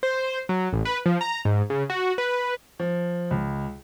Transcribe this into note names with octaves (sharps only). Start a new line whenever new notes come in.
C5
F#3
A1
B4
F3
A#5
G#2
C#3
F#4
B4
F3
C#2